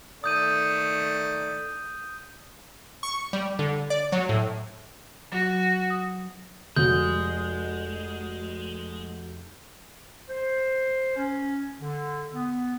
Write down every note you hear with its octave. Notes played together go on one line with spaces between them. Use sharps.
D#3 A3 D5 D#6 G6 D#7
C#6
G3
D3
D5
F#3
A2
F#3 F#4
D#6
F1 G#3 F#4 G6
C5
C#4
D3
B3